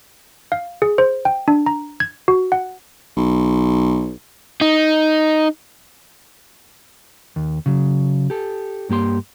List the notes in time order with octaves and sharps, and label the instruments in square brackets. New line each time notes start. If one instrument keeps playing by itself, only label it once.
[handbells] F5
G#4
C5
G5
D4
A#5
G#6
F#4
F#5
[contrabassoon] B1
[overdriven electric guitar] D#4
[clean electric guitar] D#2
C#3 F#3
G4 A4
G2 A#3 G4 C6